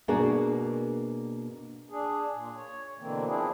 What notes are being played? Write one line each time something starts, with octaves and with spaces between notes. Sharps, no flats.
B2 A#3 D4 F#4 G#4 A#4
D4 G#4
A#2
C#5
B2 D3 E3 A#3 C4
F3 C4 D4 E4 G#4